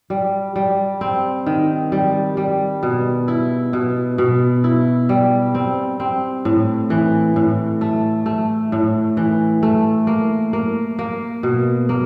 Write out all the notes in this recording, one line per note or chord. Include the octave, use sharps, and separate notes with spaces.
G3
G3
C4
D#3
G3
G3
B2
E4
B2
B2
E4
G3
C4
C4
A2
E3
A2
A3
A3
A2
E3
A3
A#3
A#3
A#3
B2
A#3